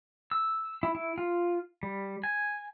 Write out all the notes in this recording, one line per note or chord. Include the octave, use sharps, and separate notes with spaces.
E6
E4
E4
F4
G3
G#5